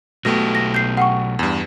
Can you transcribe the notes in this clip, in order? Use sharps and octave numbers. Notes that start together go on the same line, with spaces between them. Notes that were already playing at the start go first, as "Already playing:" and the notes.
B1 B2 A3 G4 A#6
A#6
G6 C7
F#5 G5 C#6
E2 G2